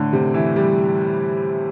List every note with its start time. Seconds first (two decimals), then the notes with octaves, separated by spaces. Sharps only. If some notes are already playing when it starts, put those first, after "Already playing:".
Already playing: A2 D3
0.13 C3
0.34 E3
0.56 G3